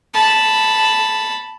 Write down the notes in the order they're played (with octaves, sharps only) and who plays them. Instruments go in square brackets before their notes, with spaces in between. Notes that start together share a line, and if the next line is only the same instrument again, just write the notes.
[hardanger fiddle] A5 B5